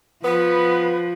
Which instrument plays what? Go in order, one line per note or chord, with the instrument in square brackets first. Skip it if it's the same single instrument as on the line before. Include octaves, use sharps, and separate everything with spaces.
[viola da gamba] F3 [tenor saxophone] B3 [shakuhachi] B4